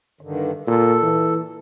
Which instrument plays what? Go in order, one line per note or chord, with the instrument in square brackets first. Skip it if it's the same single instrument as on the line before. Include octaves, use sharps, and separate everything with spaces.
[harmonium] G2 D3 D#3
[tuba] A#2 [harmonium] A4
[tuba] E3